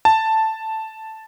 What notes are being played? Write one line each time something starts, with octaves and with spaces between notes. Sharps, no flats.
A5